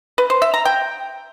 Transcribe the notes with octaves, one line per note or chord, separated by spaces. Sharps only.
B4
C5
E5
A#5
G5